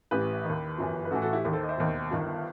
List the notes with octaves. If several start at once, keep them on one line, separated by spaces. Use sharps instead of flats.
A1 A2 E3 G4 B4
D#2 D#3
G1 F#2 E3
B4
A1 A2 E3 F#4 A4
F#4 A4
E4 G4
D#2 D#3
A4 C5
D#5
C5 E5
E1 D#2 D#3
G1 G2 D#3